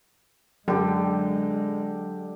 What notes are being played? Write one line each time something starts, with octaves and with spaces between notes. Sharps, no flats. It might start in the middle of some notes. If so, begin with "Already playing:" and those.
F#2 D3 F#3 G#3 G4